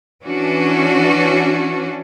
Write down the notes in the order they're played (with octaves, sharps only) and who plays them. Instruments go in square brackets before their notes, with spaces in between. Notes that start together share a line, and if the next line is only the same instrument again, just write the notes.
[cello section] E3 C#4 D4 F#4